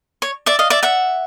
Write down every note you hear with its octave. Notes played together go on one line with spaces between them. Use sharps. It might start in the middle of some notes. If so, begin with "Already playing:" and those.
C#5
D5 E5
D#5 F5
D5 E5
E5 F#5